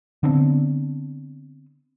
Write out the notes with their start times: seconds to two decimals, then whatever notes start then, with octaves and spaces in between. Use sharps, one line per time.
0.23 D3 B3 C4 D4